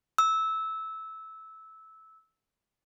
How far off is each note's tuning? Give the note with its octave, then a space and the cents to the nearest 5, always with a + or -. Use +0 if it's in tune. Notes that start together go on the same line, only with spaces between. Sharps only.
E6 -15